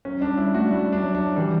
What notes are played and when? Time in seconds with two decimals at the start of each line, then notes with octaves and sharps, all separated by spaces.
0.05 F#3 C#4
0.21 G3 D4
0.37 G3 E4
0.54 A3 F#4
0.71 G3 E4
0.92 G3 D4
1.03 F#3
1.15 D4
1.36 E3 G3